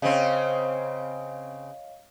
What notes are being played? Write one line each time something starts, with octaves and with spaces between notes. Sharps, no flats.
C#3 C4 C#5 D#5 F5